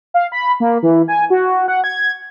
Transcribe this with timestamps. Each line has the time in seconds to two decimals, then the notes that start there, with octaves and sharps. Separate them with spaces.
0.14 F5
0.32 B5
0.60 A#3
0.83 E3
1.08 G#5
1.30 F#4
1.68 F#5
1.84 G#6